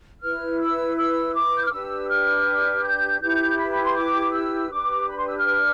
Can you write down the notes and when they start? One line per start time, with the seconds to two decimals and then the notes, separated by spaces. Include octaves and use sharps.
0.21 E4 B4 F6
0.59 E6
0.96 E6
1.33 D6
1.57 G6
1.63 F6
1.71 D4 G4 B4 E6
2.09 F6
2.83 G6
3.21 E4 G4 B4 G6
3.58 B5
3.71 B5
3.83 C6
3.95 D6
4.33 E6
4.70 D4 G4 B4 D6
5.08 B5
5.17 C6
5.26 E6
5.35 F6